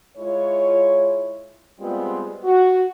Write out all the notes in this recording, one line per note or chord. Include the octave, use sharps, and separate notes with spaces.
G#3 E4 F4 C#5
G3 G#3 B3 C4 F4
F#4